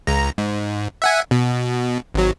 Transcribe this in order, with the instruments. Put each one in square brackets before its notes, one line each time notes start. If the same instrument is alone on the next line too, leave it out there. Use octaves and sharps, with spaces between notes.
[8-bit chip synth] C#2 A#5
G#2
E5 F#5 G#5
B2
G#1 F#3